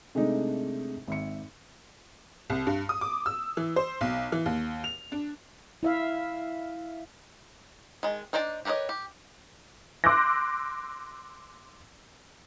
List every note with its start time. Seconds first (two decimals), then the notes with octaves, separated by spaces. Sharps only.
0.15 C3 G#3 A3 D4 D#4
1.08 G#1 E5 C#7
2.50 C2
2.67 G2
2.89 D#6
3.01 D6
3.26 E6
3.57 E3
3.76 C5
4.01 B1
4.32 E3
4.46 D#2
4.84 F7
5.12 D4
5.83 E4 E5 F5
8.03 D#3 G#3
8.33 D4 D#4 C5 D5 A5
8.65 G4 A#4 B4 C#5 D#5
8.89 G4
10.04 C6 D6 E6 F#6 G6 A#6